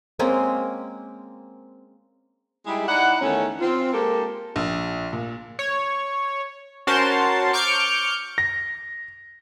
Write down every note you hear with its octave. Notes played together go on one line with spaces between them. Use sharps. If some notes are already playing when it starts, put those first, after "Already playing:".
G#3 A#3 C4 C#4
G3 G#3 D#4 E4 G4 G#4
D#4 E4 D5 F#5
E2 D#3 A3 C#4
C4 F4
G#3 A#3 G4 A4 A#4
A#1
A#2
C#5
C#4 F#4 A#4 C5 A5 C6
C#6 D6 F6 G6 C#7 D7
A#6